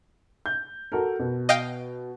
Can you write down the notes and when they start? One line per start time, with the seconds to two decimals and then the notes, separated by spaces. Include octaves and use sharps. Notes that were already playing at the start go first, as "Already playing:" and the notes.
0.46 G6
0.92 F#4 A4 A#4
1.19 B2
1.49 D#5 F5 G5